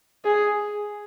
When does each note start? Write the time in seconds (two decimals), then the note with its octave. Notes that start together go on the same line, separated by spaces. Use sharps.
0.25 G#4